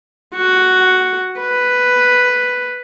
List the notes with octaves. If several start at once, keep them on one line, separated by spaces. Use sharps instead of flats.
F#4
B4